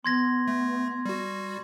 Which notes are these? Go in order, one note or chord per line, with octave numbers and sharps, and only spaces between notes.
B3 C6 G#6 A#6
A3
G3 F#4